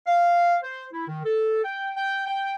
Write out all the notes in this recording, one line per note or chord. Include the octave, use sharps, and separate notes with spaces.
F5
C5
E4
D#3
A4
G5
G5
G5